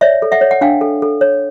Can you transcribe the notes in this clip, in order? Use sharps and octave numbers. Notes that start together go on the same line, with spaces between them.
C#5 D5 E5
A4
E5 F#5
C#5
F#5
D4 F5 G5
A4
A4
C#5